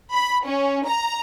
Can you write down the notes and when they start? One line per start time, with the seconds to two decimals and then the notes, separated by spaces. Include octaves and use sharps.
0.12 B5
0.45 C#4
0.86 A#5